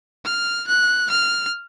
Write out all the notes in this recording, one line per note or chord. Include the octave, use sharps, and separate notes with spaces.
F6
F#6
F6